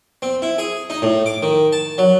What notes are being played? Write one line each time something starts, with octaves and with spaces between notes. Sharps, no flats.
C4
E4
G#4
D#4
A2
D6
D#3
A5
F#3